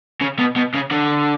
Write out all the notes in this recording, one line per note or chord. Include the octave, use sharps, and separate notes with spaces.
C#3
B2
B2
C#3
D3